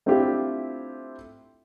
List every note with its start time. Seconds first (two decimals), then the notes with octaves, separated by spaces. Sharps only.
0.06 A3 C4 D4 E4 F4 G4